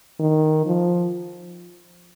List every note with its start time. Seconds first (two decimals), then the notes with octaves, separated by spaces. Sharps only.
0.20 D#3
0.67 F3